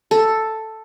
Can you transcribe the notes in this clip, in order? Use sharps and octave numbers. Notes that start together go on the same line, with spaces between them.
A4